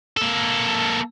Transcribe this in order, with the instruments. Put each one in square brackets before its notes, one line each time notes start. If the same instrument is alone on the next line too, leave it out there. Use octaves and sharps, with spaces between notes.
[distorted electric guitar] A#3 A4